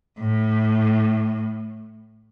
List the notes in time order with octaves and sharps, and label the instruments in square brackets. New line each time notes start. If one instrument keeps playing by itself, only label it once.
[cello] A2